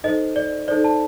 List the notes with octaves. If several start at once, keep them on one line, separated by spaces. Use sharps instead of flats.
D#4 A4 C5 D#5
D5
D#4 A4 C5 D5
A5